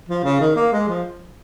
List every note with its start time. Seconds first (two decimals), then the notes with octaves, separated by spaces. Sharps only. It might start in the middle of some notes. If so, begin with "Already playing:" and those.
0.09 F3
0.24 C#3
0.40 D#3
0.56 A#3
0.73 G#3
0.88 F3